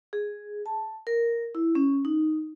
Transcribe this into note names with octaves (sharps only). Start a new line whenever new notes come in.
G#4
A5
A#4
E4
C#4
D#4